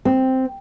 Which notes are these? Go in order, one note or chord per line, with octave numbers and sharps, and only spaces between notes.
C4